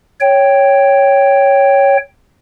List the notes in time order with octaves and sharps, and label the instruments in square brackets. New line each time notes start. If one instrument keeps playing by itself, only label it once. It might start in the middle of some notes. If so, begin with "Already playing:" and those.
[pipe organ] C#5 G5